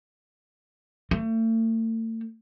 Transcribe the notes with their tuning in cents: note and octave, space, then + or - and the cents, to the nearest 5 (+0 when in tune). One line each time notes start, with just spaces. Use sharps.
A3 +40